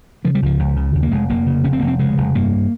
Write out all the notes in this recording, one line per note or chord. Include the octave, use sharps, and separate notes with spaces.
C#3 F3
G3
C#2 F3
C#2
C#3
D#2
A#3
F1 G#3
F1 A#3
C#3
F1 C#4
C4
F1 A#3
C4
C#3 G#3
F1
G2 A#3